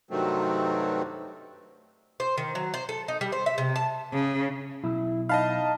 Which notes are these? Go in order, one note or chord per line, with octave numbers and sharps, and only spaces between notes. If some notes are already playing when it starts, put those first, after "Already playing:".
G2 C3 D#3 F#3 A3 C4
C5
D#3
F#3
C5
A4
D#4
G3
C5
E5
C3
A5
C#3
B1 E4
D#4 D#5 F5 A5 B5